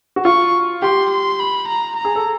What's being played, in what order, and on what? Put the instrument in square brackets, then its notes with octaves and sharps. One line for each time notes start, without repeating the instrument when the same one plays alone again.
[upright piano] F#4
[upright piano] F4 [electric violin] C#6
[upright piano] G4 [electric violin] C6
[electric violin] C6
B5
A#5
A#5
[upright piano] G#4
A4